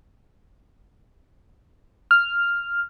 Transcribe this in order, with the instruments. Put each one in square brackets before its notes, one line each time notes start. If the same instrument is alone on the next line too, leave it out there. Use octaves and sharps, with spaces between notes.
[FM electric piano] F6